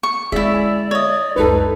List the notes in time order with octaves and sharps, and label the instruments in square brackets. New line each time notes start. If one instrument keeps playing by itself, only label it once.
[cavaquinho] C#6
[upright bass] D3 G#3 [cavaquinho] E4 E5 [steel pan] G#4 [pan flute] D5
[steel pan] G#5
[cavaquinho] C#5 D#5
[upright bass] C#2 F#2 [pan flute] D#4 [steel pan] A4 B4